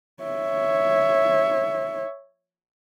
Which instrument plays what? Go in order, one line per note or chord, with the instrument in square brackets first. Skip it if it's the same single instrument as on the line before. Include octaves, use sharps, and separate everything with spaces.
[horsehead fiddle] C#5 E5